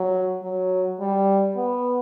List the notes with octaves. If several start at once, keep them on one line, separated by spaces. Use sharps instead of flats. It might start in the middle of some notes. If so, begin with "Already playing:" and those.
Already playing: F#3
F#3
G3
B3